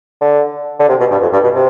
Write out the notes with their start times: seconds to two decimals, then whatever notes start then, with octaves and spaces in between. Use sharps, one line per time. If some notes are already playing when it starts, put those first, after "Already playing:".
0.21 D3
0.79 D3
0.89 C3
0.99 B2
1.11 G2
1.21 F2
1.32 G2
1.43 B2
1.55 C3